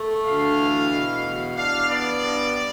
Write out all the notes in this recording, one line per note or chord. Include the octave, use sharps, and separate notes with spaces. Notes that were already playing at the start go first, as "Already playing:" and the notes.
Already playing: A3
D2 F5
E3
B2
E2
D4 F5
B3 D5
G2